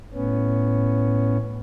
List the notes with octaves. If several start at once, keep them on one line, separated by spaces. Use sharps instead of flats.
A2 B3 C#4